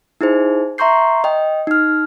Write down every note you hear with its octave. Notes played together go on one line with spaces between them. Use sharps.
D#4 E4 G#4 C5
E5 A#5 C6 C#6 G6 C7
D#5 G5
D#4 F6